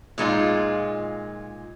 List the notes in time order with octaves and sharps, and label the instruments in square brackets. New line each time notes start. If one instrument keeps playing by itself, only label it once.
[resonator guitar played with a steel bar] A#2 G#3 D#4 F4